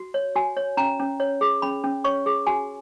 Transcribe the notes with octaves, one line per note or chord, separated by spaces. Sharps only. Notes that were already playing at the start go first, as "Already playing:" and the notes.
Already playing: F#4
C#5
F#4 G#5
C#5
C#4 A#5
C#4
C#5
G#4
C#4 B5
C#4
C#5 C#6
G#4
F#4 G#5